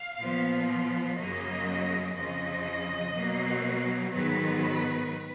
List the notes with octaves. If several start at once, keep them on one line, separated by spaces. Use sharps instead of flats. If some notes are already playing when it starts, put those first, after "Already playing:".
Already playing: F5
A#2 F3 B3
F#2 C#3 F#3 A#3 D#5
F2 C#3 F3 D#5
B2 F#3 A#3
G#2 D#3 F#3 B3 B4